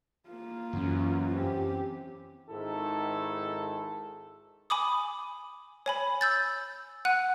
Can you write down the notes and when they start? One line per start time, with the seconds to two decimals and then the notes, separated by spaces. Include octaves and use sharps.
0.28 A#3 F4
0.73 F#2 E3 C#4
1.33 C4 G4
2.50 G#1 G#2 D#3 E4 A4
4.70 G#5 B5 D6 D#6
5.86 C#5 G#5 B5
6.21 E6 G6 A6
7.05 F#5 F#6 D#7